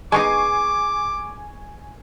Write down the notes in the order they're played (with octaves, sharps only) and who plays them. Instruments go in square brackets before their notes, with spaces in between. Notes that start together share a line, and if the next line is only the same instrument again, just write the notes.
[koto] G#3 B3 D#4 [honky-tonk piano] G#5 C#6 C7 [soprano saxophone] D6